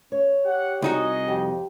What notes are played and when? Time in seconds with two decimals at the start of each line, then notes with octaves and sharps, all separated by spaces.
0.12 C#4 C#5
0.45 G4 F#5
0.82 C2 D#4 F#4 G#4 D#5
1.28 F2 G4